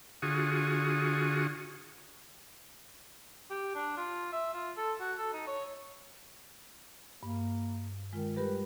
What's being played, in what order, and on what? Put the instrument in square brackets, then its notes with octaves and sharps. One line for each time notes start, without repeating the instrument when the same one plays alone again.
[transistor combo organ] D3 F4 F#4 G#4 C#6 D#6
[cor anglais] G4
D4
F4
E5
F4
A4
F#4
A4
D#4
C#5
[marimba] G2 [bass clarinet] A#3
[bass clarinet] D#3 [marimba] G#3 F4
[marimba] G3 G4 A#4 [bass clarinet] B4